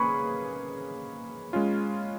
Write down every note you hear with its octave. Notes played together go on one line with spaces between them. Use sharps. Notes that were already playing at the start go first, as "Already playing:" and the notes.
Already playing: A#3 C#4 G#4 B4 B5 C#6
G#3 C#4 F4